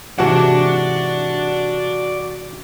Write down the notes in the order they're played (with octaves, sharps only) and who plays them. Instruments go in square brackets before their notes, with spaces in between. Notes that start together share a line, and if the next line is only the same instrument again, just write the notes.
[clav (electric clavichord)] G#2 C3 E3 [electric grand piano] F#4 F#5 [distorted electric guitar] D5 A5